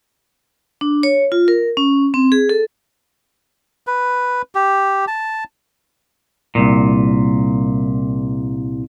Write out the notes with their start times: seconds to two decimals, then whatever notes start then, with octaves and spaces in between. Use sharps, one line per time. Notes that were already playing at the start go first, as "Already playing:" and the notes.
0.81 D4
1.03 C#5
1.32 F4
1.48 A#4
1.77 C#4
2.14 C4
2.32 G#4
2.49 A4
3.87 B4
4.55 G4
5.07 A5
6.55 C2 A#2